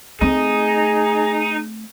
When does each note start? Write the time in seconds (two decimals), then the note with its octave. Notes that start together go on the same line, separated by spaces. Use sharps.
0.21 A3 C4 D#4 G#4